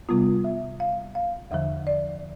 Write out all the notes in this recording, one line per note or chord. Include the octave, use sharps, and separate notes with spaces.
C3 G3 B3 F4
E5
F5
F5
E2 D3 F3 E5
D5